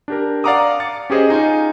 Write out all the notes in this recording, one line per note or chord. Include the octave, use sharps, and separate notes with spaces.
D4 G4 A#4
D5 F5 F#5 A#5 D6 D#6
D6 A6 C#7
C#4 G4 G#4 C5 D#5
D#4 F4 G#5